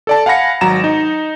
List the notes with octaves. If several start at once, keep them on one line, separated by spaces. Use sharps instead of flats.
A4 D5 A5
F5 F#5 G#5 B5 A#6 C#7
G#1 F#3 A#5 A#6 E7
D#4